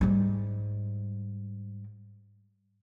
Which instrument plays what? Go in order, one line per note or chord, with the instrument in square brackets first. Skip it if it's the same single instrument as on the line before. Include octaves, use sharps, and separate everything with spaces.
[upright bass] G#2 G3